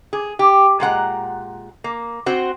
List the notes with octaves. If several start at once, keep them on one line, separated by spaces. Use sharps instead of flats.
G#4
G4
A#2 G#3 F#5 A#5
A#3
C4 F#4 C5